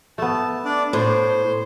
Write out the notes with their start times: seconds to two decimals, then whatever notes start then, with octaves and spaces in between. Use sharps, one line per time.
0.18 A3 B3 A5
0.65 D4 D5
0.93 A2 C5